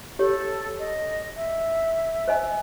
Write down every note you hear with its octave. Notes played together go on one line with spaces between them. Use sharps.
G4 A4 C#5
D#5
E5
C5 D#5 G#5